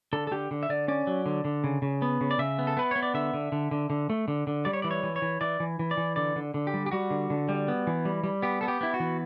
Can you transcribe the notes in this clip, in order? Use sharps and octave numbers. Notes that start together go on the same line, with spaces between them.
D3 A4
A4
D3 G4
D3
E5
D3 D5
C#4 D5
F#3
D3
D3
C#3
C#3
B3
C#3
D5
C#3 E5
B3
A4
B3 B4
B3 C#5
D5
D3 E5
D3
D3
D3
D3
A3
D3
D3
G3 D5
C#5
E3 D5
C#5
E3
C#5
E3
E3 D5
E3
E3
D5
E3
D3 D5
D3
D3
G4
G3
G4
G3 F#4
D3
D3
G3
B3
E3
G3
G3
B3 G4
B3 A4
G4
B3 E4
F#4
E3